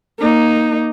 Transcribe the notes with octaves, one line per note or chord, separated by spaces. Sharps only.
A#3 D#4